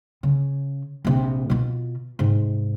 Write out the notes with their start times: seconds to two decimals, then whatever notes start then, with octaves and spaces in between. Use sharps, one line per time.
0.23 C#3
1.05 A#1 C3
1.50 B2 F4
2.19 G#2 C3